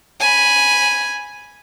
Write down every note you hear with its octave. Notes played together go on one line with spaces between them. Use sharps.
G#5 B5